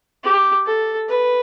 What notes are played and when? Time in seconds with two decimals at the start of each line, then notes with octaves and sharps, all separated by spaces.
0.24 G4
0.66 A4
1.09 B4